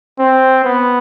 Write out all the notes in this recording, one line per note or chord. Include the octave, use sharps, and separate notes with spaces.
C4
B3